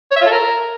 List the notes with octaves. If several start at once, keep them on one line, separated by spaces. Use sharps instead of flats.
C#5
E5
F4
A4
A#4